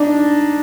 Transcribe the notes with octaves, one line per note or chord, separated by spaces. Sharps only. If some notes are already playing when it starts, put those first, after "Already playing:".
Already playing: D4 D#4